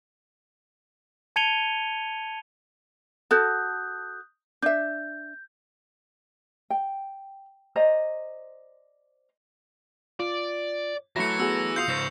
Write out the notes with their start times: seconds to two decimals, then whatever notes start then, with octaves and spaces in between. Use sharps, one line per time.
1.36 A5 G#6 C#7 D#7 F7 G7
3.31 F#4 A4 A5 D#6 F#6 G6
4.62 D4 E5 G6
6.70 G5
7.76 C5 D5 D#5 A#5
10.20 F4 D5
11.16 E3 F#3 A3 A#6 C#7
11.40 B3 F#4 G#4 E6
11.76 F4 F5 D#6 G6 C7 F7
11.89 G#2 C#3 C5 A#6